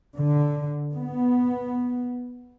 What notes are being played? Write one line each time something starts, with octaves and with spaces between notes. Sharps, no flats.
D3
B3